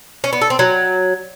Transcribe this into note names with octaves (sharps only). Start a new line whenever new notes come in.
C#4
B3
A4
C4
F#3